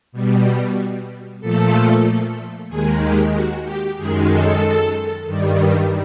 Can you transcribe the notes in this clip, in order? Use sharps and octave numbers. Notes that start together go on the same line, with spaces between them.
B2 G3
A#2 F3 A3 A4
D#2 D#3 G#3 G#4
G4
F#4
G4
F#2 D#3 G#3 G#4
A4
G2 D#3 G3